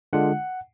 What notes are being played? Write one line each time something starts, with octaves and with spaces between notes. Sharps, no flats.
D3 G#3 D4 F4 F#5